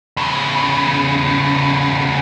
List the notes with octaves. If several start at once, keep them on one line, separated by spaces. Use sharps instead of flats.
E2 C#3